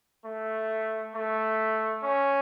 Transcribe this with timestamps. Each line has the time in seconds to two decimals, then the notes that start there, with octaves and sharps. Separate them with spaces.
0.25 A3
1.14 A3
2.03 C#4